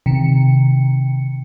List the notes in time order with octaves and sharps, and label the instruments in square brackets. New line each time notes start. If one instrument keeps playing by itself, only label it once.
[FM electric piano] C3 D#3 C#7